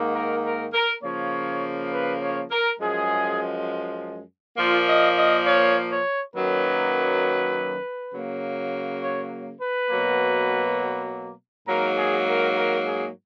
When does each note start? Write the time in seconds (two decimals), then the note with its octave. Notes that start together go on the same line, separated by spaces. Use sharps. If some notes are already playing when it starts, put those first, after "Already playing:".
Already playing: G#2 D#3 A#3
0.14 A#4
0.44 A#4
0.74 A#4
1.03 C#3 F3 A#3 C#5
1.92 B4
2.21 C#5
2.51 A#4
2.80 F#2 F3 G#3 G#4
4.57 A#2 F3 A#3 F4
4.87 D#5
5.16 D#5
5.46 C#5
5.90 C#5
6.35 F#2 D#3 F#3 A#3 B4
8.12 C#3 F#3 A#3
9.01 C#5
9.60 B4
9.90 B2 F#3 A#3
11.66 G#2 F#3 A#3 A#4
11.96 G#4
12.27 A#4
12.56 A#4
12.85 G#4